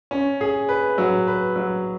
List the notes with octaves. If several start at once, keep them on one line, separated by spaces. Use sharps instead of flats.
C#4
G#4
B4
F#3
B4
F#3